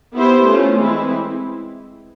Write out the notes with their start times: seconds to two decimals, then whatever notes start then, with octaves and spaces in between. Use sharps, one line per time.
0.15 B3 E4 G4 C5
0.46 A3 C#4 F4
0.78 E3 G#3 C4 E4